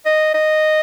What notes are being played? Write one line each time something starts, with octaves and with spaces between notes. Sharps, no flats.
D#5
D#5